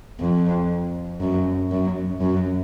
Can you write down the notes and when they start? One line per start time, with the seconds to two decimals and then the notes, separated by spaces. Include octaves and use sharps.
0.20 F2
1.21 F#2
1.71 F#2
2.21 F#2